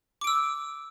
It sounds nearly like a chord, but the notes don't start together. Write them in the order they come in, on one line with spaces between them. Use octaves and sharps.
D6 D7 E6